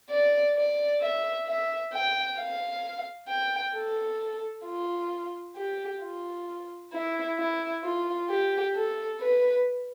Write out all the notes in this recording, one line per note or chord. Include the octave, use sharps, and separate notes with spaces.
D5
D5
E5
E5
G5
F5
G5
A4
F4
G4
F4
E4
E4
F4
G4
A4
B4